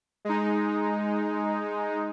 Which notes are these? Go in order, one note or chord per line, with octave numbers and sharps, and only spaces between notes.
G#3 D#4